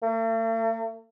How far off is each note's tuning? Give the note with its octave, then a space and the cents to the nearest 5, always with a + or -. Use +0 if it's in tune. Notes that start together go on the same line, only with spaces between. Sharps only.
A3 +45